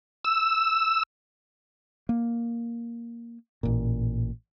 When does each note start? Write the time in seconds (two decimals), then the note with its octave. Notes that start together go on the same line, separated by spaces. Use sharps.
0.25 E6
2.09 A#3
3.63 A1 A#2